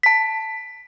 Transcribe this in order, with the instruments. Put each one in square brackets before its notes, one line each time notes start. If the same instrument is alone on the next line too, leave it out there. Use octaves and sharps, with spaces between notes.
[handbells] A5 B6